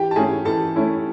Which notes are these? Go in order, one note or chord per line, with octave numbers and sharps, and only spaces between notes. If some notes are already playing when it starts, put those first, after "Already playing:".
Already playing: E3 G4 G5
A5
A3 C#4 E4 G#4 G#5
E3 A4 A5
A3 C#4 E4